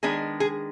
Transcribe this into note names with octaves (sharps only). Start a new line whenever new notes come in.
D#3 G#3 B3 D4 G#4
G#4